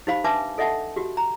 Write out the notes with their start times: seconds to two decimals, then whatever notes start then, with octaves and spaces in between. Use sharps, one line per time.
0.07 D#4 G4 C5 F5 B5
0.24 D4 B4 E5 G#5 A5 D6
0.58 A4 D#5 E5 F#5 A5
0.96 F#4 G4
1.17 A#5